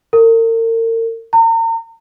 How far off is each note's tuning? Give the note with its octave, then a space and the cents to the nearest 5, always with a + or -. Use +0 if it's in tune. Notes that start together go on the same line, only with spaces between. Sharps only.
A#4 -40
A#5 -40